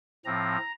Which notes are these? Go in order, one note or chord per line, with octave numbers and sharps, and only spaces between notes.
A2 F3 C4 A#5